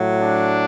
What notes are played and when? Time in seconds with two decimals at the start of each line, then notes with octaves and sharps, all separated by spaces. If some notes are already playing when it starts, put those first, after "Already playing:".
Already playing: A2 F#3
0.18 D4